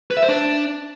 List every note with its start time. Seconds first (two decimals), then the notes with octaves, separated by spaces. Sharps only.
0.11 B4
0.17 E5
0.23 C5
0.28 D4